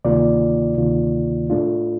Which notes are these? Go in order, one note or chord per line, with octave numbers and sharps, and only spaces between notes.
D2 C3 D#3 A#3 F4 D5
D2 C3 D#3 A#3 F4
A2 A3 D4 F4